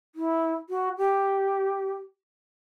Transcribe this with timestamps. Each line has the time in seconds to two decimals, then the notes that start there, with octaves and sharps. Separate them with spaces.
0.15 E4
0.70 F#4
0.98 G4